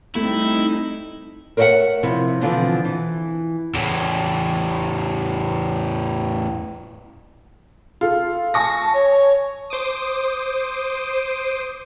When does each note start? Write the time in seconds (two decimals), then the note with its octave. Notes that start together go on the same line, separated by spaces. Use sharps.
0.16 G3 A3 C4 D#4 E4
1.57 A#4 C5 C#5 D#5 E5 F#5
2.03 C3 F3 E4
2.41 B2 D3 E3 F3 C4 F4
2.85 E3
3.74 E2 A2
8.01 F4 A4
8.54 G#5 A5 C#6 A#6
8.94 C#5
9.70 C5 D6 D#6